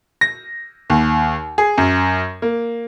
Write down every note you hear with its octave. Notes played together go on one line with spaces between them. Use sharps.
A#6
D#2
G#4
F#2
A#3